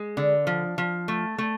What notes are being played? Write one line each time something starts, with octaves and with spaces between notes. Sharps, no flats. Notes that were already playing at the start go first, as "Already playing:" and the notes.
Already playing: G#3
D3
F3
F3
A3
A3